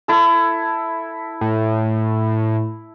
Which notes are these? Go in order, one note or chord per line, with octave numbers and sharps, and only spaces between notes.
E4 A4
A2